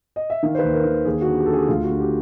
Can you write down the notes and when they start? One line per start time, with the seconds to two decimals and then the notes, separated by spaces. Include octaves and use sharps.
0.16 D#5
0.30 E5
0.43 D#3 F5
0.55 C5
0.59 D#2 B4
0.74 A#4
0.84 D#3
1.05 D#2 G#4
1.22 D3 F#4
1.37 G4
1.46 D3 A4
1.53 G#4
1.68 D2 F4
1.84 F#4
1.89 D3
2.00 G4